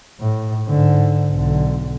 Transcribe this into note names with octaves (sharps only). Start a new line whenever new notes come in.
A2
G#2 D3
B1 D3